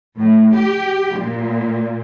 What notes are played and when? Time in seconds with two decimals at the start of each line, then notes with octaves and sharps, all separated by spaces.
0.18 A2
0.56 G4
1.18 A#2